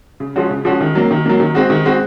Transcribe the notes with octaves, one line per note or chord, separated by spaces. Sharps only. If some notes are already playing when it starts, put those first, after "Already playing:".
C#3
F3 G#3 C#4 F#4
C#3
F3 G#3 C#4 F#4
D#3
F#3 A#3
D#3
F#3 A#3
D#3
G#3 C4 F#4
D#3
G#3 C4 F#4